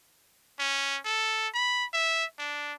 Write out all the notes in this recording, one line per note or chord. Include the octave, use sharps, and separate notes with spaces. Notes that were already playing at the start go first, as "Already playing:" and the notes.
C#4
A4
B5
E5
D4